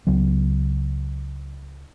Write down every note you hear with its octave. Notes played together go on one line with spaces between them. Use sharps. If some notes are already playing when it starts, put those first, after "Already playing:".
C#2 F#3 B3